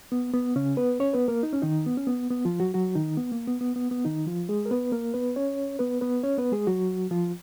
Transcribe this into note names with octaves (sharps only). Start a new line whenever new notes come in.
B3
B3
C#3 C#4
B3 B4
C#4 C#5
B3 B4
A#3 A#4
D#4
C#4
D#3 D#4
B3
C#4
B3
B3
F3 F4
F#3 F#4
F#3 F#4
D#3 D#4
B3
A#3
B3
B3
B3
B3
D#3 D#4
F3 F4
G#3 G#4
A#4
B3 B4
A#3 A#4
B3 B4
C#4 C#5
B3 B4
B3 B4
C#4 C#5
B3 B4
G#3 G#4
F#3 F#4
F3 F4